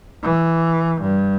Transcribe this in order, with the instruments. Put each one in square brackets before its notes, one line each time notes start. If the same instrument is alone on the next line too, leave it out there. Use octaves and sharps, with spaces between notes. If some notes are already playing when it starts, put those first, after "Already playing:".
[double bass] E3
G2